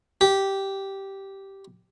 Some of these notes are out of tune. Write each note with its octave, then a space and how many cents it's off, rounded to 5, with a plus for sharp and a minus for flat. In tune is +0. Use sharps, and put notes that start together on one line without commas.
G4 -10